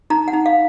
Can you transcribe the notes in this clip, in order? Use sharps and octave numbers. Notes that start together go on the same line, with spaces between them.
D#4 A#5
F#5
D#4
F5